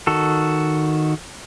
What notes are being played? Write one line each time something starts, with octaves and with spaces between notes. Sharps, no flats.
D#3 F#4 A4